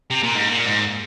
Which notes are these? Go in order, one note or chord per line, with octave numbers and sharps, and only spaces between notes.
C3
A#2
G#2
A#2
G#2